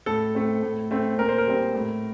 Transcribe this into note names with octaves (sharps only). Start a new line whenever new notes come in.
A2 A4
A3 C4
A2
A3 C4
A#2 A#4
C5
A#4
G3 C4
A2